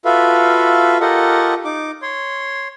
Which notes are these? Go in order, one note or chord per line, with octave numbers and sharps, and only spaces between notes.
F4 F#4 A4 B4 E5 F5
F4 G4 A4 A#4 D#5 F#5
D#4 D6
C#5 C6